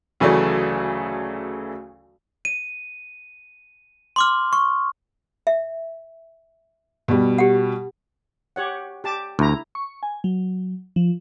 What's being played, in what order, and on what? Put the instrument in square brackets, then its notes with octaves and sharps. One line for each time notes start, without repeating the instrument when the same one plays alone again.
[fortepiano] D2 C#3 E3 F#3 A3 D5
[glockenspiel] D#7
C6 D6 F6
C#6
[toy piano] E5
[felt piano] B2 G3
[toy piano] G4 F#5
[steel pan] G4 C#5 F#5
G4 A5 D6
[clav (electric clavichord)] D2 [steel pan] E4 A#5
[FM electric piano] C#6
G#5
F#3
F3